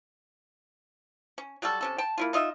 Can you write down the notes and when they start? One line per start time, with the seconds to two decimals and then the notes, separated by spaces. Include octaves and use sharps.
1.38 C#4
1.62 F#3 G3 F#4 A4
1.81 C3 C#4 A4
1.98 G5 A5
2.18 A#3 E4 F4
2.33 D#4 F4 D#5 E5